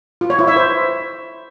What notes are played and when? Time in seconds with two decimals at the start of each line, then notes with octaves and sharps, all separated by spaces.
0.21 F4
0.30 C#5
0.39 E4
0.48 E5
0.56 C5